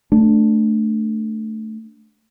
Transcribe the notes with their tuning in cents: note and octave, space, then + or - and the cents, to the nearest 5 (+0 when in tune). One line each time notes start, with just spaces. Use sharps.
A3 +0 D4 +0